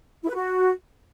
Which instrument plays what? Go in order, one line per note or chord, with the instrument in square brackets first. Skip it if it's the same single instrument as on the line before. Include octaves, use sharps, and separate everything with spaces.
[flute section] E4
B4
F#4